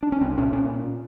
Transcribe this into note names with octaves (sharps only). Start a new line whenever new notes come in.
D4
C#4
C2 C4
A#2 C#4
A#2 C#4